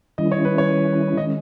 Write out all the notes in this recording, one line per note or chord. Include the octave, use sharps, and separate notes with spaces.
D#3 G3 C#4 E4 D#5
C#5
B4
C#5
D#3 G#3 C#4 D#5